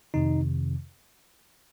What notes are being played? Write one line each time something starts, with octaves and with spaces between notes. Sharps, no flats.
F2 C3 D#3 D#4